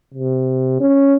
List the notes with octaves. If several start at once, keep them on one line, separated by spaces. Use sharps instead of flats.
C3
C#4